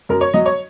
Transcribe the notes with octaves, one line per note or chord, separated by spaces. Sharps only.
F#2 A#4
C#5
F#3 D#5
C#5